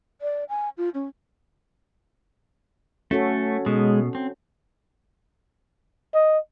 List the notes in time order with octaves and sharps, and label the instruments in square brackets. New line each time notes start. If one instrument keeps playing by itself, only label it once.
[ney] D5
G#5
F4
C#4
[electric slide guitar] A3 [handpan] C#4 F#4 A4
[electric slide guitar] B2 [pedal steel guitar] G#3
[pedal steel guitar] C4
[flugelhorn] D#5